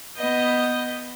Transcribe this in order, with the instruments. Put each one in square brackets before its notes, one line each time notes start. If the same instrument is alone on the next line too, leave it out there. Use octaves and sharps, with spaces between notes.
[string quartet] B3 D#5 G6